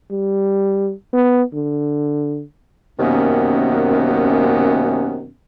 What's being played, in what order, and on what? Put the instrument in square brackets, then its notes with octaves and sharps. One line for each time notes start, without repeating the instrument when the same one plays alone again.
[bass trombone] G3
B3
D3
[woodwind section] F#2 C3 D#3 A#3 B3 C#4